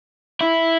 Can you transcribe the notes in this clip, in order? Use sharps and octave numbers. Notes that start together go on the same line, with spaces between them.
E4